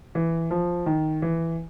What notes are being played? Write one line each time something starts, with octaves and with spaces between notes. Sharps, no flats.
E3
F3
D#3
E3